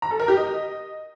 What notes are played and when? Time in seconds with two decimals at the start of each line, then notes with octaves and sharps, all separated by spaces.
0.02 A#5
0.11 A4
0.20 A#4
0.28 G4
0.37 D#5